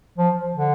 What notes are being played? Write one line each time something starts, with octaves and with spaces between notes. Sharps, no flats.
F3
D3